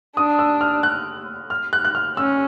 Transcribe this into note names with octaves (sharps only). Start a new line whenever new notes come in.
D4 D#6
E6
F6
F#6
F6
F#6
F#6
F6
C#4 E6